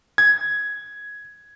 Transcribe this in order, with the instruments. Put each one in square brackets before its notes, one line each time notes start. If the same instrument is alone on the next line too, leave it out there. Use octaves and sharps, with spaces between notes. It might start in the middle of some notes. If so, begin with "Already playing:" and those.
[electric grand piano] G#6